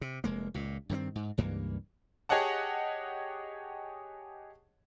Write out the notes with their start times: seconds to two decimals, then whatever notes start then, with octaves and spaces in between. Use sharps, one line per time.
0.01 C3
0.24 F1 G#3 A#3
0.54 C#2 A#2
0.89 G2 D#3 A#3 C4
1.15 G#2
1.38 C#2 G2 E3 A#3
2.29 G4 G#4 C#5 D#5 F#5 A5